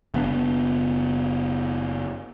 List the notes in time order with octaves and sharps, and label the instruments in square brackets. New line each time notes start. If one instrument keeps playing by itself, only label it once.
[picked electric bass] F#1 B3 D4